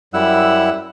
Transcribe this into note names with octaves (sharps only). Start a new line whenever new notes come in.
F#2 G3 E4 F#5 E6